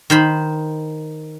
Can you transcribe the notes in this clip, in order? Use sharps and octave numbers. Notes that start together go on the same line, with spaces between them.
D#3 C5 B5